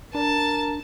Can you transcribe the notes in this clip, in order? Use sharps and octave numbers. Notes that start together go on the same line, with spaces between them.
D4 A#4 A5